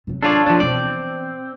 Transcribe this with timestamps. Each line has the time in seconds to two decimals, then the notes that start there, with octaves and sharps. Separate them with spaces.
0.07 C3 F#3
0.23 D4 F4 A4 C#5 D5
0.46 D3 F3 D4
0.60 B2 E3 C4 D5